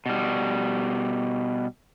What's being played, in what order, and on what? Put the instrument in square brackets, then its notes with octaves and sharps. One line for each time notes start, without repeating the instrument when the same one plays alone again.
[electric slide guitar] B2 G3